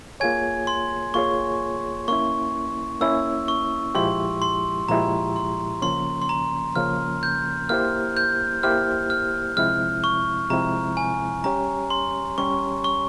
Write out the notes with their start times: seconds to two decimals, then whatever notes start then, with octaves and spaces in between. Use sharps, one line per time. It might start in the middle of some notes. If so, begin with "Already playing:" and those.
0.20 A#3 F4 G#4 C#5 G#5 G#6
0.67 C6
1.14 A#3 F4 G#4 C#5 C#6
2.08 A#3 C#4 E4 C#6
3.01 A#3 C#4 E4 E6
3.48 C#6
3.95 A#2 F3 G#3 E4 G4 C6
4.42 C6
4.89 A#2 F3 G#3 E4 G4 A#5
5.36 C6
5.82 C#3 F3 A#3 C#4 C6
6.22 C6
6.29 A#5
6.76 C#3 F3 A#3 C#4 F6
7.23 G6
7.69 A#3 E4 G4 C5 F6
8.17 G6
8.63 A#3 E4 G4 C5 F6
9.10 F6
9.57 C3 F3 G#3 C4 E4 F6
10.04 C#6
10.50 C3 F3 G#3 C4 E4 A#5
10.97 G#5
11.44 G3 C#4 G4 C#5 A#5
11.90 C6
12.38 G3 C#4 G4 C#5 C#6
12.84 C#6